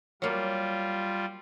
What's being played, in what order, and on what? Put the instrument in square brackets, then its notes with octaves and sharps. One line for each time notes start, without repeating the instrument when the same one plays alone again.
[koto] F#3 A#3 [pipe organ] G3 F4